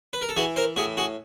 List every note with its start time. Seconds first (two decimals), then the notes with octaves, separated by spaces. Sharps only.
0.13 B4
0.22 A#4
0.29 A4
0.36 E3 F#4 G#4
0.56 A#4 C5
0.76 A2 F#4 G#4
0.97 F#4 G#4